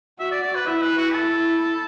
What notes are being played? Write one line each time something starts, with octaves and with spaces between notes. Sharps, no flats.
F#4 E5
D5
D5
B4
E4 E5
B4
F#4
E4 A4